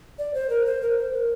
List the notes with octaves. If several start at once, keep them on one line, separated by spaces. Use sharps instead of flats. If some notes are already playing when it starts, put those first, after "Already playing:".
D5
C5
A#4
C5
A#4
C5
A#4